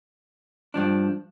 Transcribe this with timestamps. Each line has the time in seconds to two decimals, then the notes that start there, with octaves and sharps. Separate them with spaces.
0.74 G2 F3 D4